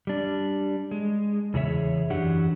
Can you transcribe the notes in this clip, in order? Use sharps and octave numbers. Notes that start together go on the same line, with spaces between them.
G3 D4
G#3
E2 C#3 G#4 C#5 E5
F#2 E3 F#3 D4 G4 F#5